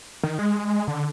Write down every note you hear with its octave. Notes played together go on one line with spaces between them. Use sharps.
D#3
G#3
D3